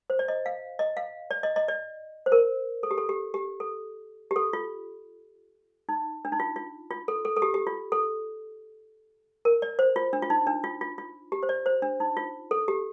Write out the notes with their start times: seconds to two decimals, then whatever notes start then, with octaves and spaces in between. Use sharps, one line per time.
0.10 C5
0.19 D5
0.28 D#5
0.46 F5
0.79 D#5
0.97 F5
1.31 D5
1.43 D#5
1.56 D#5
1.68 D5
2.26 C5
2.32 A#4
2.83 A4
2.91 G4
2.98 A4
3.09 G4
3.34 G4
3.60 A4
4.31 G4
4.36 A4
4.53 F4
5.89 D#4
6.25 D4
6.32 D#4
6.40 F4
6.56 F4
6.91 F4
7.08 A4
7.25 A4
7.36 A4
7.42 G4
7.54 G4
7.67 F4
7.92 A4
9.45 A#4
9.62 D5
9.79 C5
9.96 F4
10.13 D4
10.22 F4
10.30 D#4
10.47 D4
10.64 F4
10.81 F4
10.98 F4
11.32 G4
11.43 C5
11.49 D5
11.66 C5
11.82 D4
12.00 D#4
12.17 F4
12.51 A4
12.68 G4